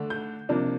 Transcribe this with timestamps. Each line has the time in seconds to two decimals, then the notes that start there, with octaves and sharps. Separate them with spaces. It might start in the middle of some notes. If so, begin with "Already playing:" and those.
Already playing: D3 A3 D4
0.10 G6
0.49 C3 F3 A#3 D4